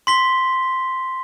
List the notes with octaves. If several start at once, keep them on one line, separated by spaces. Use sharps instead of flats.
C6 B6 G7